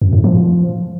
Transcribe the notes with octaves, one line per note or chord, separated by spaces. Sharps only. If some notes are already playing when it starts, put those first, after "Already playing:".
F#2
A2
F3